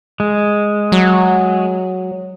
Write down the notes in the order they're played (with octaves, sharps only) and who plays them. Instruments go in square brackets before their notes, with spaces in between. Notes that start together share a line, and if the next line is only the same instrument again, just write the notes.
[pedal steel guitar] G#3
[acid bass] F#3